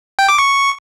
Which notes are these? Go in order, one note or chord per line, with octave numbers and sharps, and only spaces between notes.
G5
D6
C#6